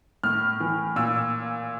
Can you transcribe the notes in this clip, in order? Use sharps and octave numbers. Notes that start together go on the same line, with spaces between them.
A2 F6
E3
A#2 E6